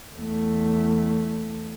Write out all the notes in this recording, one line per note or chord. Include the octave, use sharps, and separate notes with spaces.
E2 A3